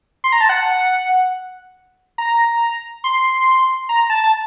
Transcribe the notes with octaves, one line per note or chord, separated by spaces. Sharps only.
C6
A#5
A5
F#5
A#5
C6
A#5
A5
A5